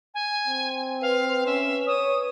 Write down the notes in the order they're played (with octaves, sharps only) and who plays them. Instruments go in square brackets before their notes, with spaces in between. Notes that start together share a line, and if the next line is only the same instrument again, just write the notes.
[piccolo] G#5
[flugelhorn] C4
[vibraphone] B4 [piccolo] F5
[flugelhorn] C#4 [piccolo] E5
[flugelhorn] C#5 [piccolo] D#6